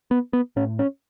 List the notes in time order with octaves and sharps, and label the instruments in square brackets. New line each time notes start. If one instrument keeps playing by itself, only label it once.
[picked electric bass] B3
B3
A2 C#4
C#4